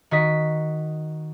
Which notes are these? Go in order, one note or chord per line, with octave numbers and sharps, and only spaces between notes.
D#3 F#4 D#5 B6